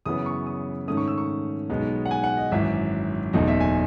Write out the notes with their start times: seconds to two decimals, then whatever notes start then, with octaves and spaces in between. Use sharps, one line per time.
0.06 F#2 C#3 E3 B3 D#6
0.26 C#6
0.46 D#6
0.88 G#2 D#3 A3 C#4 D#6
0.97 C#6
1.07 E6
1.18 C#6
1.70 B1 B2 G#3 B3 D#4
2.05 F#5
2.11 G#5
2.24 F#5
2.37 D#5
2.52 G#1 F#2 E3 E5
3.33 F#1 E2 B2 A3 D#4 D#5
3.48 E5
3.60 G#5